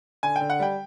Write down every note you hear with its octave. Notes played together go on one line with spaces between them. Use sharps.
D3 G#5
G5
D3
F#5
G3 G5